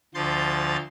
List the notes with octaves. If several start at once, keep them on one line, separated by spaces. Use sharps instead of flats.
D2 F3 C6 G6 A6